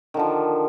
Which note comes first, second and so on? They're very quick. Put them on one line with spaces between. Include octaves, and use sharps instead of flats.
D#3 D3 F3